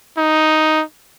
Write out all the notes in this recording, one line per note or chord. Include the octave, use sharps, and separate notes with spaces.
D#4